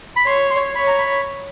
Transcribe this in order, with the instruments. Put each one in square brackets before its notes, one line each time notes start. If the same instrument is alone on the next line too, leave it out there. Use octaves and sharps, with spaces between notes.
[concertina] B5
[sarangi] C#5 [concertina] C6
[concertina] C6
[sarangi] C#5 [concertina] B5
[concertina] A#5
B5